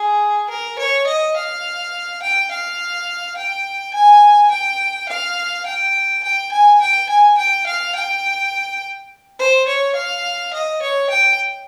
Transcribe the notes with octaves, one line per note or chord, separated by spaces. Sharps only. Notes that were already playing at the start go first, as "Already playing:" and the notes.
Already playing: G#4
A#4
C#5
D#5
F5
G5
F5
G5
G#5
G5
F5
G5
G5
G#5
G5
G#5
G5
F5
G5
C5
C#5
F5
D#5
C#5
G5